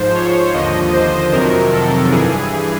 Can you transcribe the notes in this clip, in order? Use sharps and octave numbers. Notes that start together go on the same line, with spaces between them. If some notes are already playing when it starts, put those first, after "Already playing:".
Already playing: G#2 F3 C5
C#5
D#2 D3 F3 D#5
C5
F2 C3 D#3 F#3 A#4
A4
G2 E3 G#4